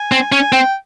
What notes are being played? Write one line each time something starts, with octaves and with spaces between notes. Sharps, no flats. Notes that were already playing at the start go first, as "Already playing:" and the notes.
Already playing: G#5
C4
C#4 G#5
C4 G5